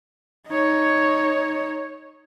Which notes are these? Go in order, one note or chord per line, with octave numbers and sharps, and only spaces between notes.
D#4 C#5